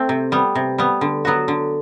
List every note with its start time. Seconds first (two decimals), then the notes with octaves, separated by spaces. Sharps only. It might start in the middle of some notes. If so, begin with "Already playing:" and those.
Already playing: A3 C4
0.09 C3
0.32 G3 B3
0.55 C3
0.78 G3 B3
1.01 D3
1.25 F#3 B3 F#4
1.48 D3